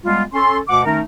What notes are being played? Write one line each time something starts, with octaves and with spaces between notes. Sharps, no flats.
G3 G#3 B3 F4
C#4 A4 C6
D2 B2 F#5 D6
D#3 A3 C#4 D#4 A#4